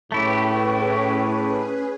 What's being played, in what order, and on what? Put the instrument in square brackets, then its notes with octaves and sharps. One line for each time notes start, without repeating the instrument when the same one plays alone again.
[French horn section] A2 [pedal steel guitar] A3 E4 G4 [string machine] C#4 G#4 B4 [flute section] C#6